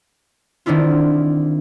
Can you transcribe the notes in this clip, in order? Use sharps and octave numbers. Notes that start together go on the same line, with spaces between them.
D#3 C4 D4 E4 F4